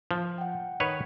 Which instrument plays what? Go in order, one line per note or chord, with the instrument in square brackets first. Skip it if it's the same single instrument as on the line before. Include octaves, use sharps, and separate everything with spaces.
[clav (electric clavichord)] F3
[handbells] F#5 G5
[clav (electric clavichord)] D#3 B4 C#5